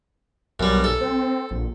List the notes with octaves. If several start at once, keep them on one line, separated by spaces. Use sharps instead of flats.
B1 F#2 G3
A4
C4
A#1